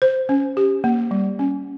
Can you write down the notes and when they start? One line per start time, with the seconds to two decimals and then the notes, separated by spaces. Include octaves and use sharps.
0.02 C5
0.29 C#4
0.57 G4
0.84 A#3
1.11 G3
1.39 C#4